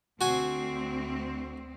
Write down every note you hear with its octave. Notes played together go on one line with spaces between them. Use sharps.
D2 C4 F#4 G#5